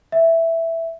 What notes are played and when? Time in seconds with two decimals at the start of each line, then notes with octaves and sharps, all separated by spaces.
0.12 E5